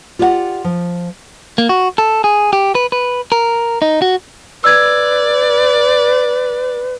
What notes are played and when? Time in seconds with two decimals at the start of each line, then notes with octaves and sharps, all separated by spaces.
0.19 F4 G4 D5 D#5 F#5
0.64 F3
1.58 A#3
1.69 F#4
1.98 A4
2.24 G#4
2.53 G4
2.75 B4
2.92 B4
3.32 A#4
3.82 D#4
4.02 F#4
4.64 B4 D5 E6 G#6